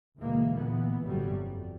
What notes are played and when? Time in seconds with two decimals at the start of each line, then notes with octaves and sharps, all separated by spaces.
0.17 D2 B2 E3 G#3 A#3
0.56 A#2 E3 B3
1.05 G1 A2 C3 F#3 G3
1.39 F2